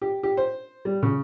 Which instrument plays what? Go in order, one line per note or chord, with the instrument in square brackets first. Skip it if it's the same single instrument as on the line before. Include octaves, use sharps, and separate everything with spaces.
[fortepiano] G4
G4
C5
G3
C#3